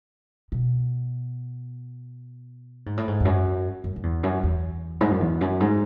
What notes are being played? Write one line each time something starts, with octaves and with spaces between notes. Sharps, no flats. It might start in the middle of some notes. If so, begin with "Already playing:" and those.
B2
G#2
A2
G#2
E2
F#2
F#2
F#2
E2
F#2
E2
G#2
F#2
E2
F#2
G#2